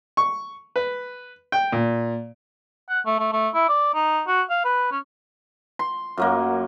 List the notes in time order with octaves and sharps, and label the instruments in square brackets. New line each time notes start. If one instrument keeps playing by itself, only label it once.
[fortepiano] C#6
B4
G5
A#2
[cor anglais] F#5
A3
A3
A3
E4
D5
D#4
F#4
F5
B4
C#4
[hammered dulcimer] C6
F#2 F#3 A#3